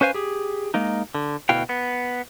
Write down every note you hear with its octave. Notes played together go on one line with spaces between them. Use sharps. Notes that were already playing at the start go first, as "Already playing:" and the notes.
C#4 B4 C5 F5 G#5
G4 G#4
G#3 A#3 D#4
D3
D2 B2 E4 F#4 F5 G5
B3